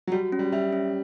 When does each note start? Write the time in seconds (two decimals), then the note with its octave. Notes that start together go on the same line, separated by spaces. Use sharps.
0.07 F#3
0.12 G3 F#4
0.32 C#4
0.39 G3
0.52 G3 E5
0.73 C#4